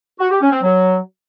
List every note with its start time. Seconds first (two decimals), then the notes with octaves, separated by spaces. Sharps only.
0.20 F#4
0.30 G4
0.41 C#4
0.52 C4
0.63 F#3